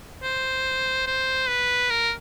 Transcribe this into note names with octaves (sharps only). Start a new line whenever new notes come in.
C5
C5
B4
A#4